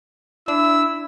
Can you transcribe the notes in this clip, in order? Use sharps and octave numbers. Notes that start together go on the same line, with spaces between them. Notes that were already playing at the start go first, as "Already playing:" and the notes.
D4 E4 E6